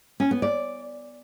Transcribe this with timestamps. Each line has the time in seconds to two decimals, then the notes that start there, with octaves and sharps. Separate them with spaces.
0.20 C#4
0.31 B3
0.42 D5